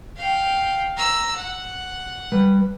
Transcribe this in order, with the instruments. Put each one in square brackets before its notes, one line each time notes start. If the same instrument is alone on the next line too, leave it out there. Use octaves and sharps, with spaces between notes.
[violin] F5 G5
A#5 E6
F#5
[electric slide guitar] G3 B4